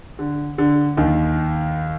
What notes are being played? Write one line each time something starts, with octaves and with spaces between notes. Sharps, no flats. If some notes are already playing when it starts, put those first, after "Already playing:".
D3
D3
D#2 D#3